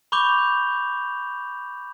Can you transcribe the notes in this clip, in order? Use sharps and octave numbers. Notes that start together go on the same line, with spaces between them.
B5 C#6 D6 G6 F7 G7